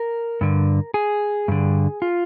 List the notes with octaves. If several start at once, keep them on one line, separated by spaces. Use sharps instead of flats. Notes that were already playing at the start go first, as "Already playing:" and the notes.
Already playing: A#4
G2 D3
G#4
G2 D3
F4